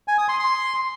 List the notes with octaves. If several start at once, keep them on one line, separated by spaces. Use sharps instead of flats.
G#5
D#6
C6
C6